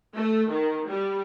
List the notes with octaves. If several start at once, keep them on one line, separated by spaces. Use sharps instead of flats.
A3
D#3
G3